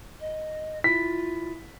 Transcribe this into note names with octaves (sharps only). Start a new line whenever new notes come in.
D#5
E4 F4 B6